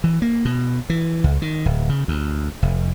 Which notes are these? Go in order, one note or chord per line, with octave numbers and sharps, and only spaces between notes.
E3
A#3
B2
E3
C#2
D#3
D1
C#3
D2
F1